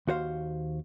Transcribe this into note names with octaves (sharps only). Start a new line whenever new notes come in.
D#2 F#4 C5 F5